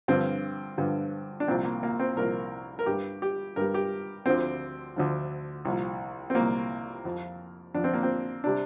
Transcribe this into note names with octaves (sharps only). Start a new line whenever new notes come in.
G2 D3 F3 C4
G2 D3 F3
D4
C2 A#2 F3 C4
A#3
A#3
C4
C2 A#2 F3 A#4
A#4
G2 G3 G4
G4
G2 G3 A#4
G4
D2 D3 F3 C4
D2 D3 F3
C2 A#2 F3
C4
C2 A#2 F3 A#3
F2 F3
F2 F3 D4
C4
A#3
C4
C3 G3 D4